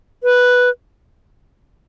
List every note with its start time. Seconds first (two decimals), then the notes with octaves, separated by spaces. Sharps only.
0.23 B4